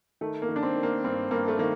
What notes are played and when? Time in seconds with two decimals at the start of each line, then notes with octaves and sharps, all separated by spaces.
0.21 D#3 A3
0.42 A#3
0.49 D#3
0.56 D4
0.63 C4
0.76 D#3
0.83 A#3
1.04 G2 C4
1.31 G2 A#3
1.48 A3
1.58 D#3 A#3